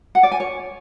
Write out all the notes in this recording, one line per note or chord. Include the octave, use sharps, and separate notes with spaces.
F#5
D5
G#5
C#5